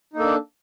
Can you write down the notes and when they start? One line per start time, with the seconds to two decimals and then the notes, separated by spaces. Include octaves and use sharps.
0.13 D#4
0.16 A#3
0.19 A4
0.22 D4